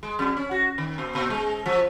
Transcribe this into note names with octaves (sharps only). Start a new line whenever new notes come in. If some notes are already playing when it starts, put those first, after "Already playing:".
G#3
F2
C#4
F#4
D#3
A#2
A#2
G#3
F3